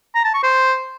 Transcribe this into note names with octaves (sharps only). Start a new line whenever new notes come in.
A#5
A5
C#6
C5